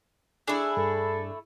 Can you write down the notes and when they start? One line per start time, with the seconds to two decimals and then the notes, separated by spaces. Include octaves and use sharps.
0.48 A3 D4 E4 G#4
0.77 G2 A4